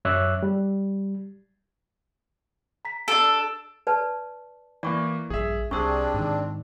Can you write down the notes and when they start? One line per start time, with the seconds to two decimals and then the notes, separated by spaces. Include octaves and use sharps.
0.05 F#2 C#5 E5 D6 E6 F#6
0.43 G3
2.85 A#5 B6
3.08 D4 A4 E6 D7
3.87 B4 D5 A5
4.83 E3 A#3 D5 C#6
5.30 A#1 G2 G#4 E5
5.71 C2 C3 C4 D4 G#4 C#6 E6
6.14 G#2 D#3